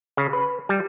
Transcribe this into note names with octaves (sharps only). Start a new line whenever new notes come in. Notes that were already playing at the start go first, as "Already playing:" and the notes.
C#3
B4
G3